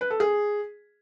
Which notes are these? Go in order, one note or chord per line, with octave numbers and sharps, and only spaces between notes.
B4
A4
G#4